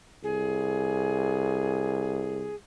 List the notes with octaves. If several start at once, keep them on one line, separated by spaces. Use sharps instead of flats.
C2 G#4